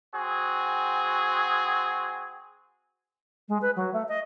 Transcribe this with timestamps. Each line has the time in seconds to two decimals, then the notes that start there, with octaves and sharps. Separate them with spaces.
0.14 C4 F#4 G#4
3.48 G#3
3.62 B4
3.76 F#3
3.93 A3
4.08 D#5